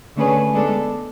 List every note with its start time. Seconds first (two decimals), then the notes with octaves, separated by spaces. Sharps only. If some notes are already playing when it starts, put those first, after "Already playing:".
0.16 D3 A3 C#4 G#4 B4
0.53 G#3 B3 D4 A4